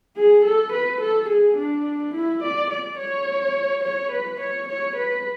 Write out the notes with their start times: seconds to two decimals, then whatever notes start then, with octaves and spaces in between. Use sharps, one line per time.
0.16 G#4
0.44 A4
0.72 B4
1.01 A4
1.29 G#4
1.57 D4
2.14 E4
2.43 D5
2.70 D5
2.98 C#5
3.84 C#5
4.12 B4
4.40 C#5
4.68 C#5
4.96 B4